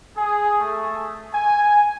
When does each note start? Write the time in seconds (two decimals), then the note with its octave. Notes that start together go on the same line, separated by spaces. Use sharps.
0.17 G#4
0.60 A3
1.34 G#5